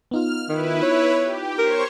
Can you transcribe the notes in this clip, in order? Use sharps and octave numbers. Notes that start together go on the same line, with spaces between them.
B3 D#4 F4 F6
D#3 E4 B4
C#5
G4
A#4 C5 C#5 C#6